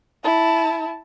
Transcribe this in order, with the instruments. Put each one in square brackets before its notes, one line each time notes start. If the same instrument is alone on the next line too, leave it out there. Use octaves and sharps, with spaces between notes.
[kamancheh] E4 A5